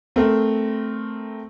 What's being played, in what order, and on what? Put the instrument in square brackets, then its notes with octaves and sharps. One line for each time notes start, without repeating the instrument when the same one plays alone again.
[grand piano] A3 C4 A#4